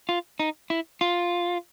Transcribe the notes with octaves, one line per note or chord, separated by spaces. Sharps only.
F4
D#4
E4
F4